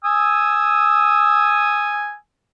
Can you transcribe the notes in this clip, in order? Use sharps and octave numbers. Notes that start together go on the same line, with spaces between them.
G#5 D#6 E6